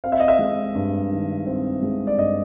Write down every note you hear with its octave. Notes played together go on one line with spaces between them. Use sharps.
C4 F5
E5
D#5
E5
G#3
G2
D#3
C4
G#3
D5
G2 D#5